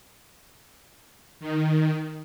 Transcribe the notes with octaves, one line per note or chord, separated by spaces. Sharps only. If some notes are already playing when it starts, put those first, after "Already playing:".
D#3